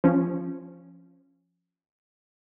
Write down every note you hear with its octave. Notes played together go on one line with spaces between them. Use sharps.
F3 C#4